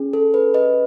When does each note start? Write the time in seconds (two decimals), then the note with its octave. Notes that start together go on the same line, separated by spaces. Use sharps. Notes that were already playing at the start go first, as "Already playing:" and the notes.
Already playing: C#4 G#4
0.13 A4
0.34 B4
0.54 B4 D#5